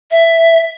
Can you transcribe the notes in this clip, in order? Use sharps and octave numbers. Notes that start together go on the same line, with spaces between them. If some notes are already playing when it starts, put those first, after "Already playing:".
E5